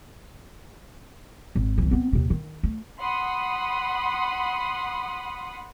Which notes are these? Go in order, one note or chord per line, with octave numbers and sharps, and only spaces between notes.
G#1
C2 E3
B3 C4
D#2 C3
D#3
A3
F#5 B5 C6 D#6